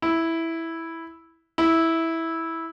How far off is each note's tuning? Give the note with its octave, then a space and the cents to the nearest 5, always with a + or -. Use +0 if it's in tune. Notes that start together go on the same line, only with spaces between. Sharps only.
E4 -5
E4 -10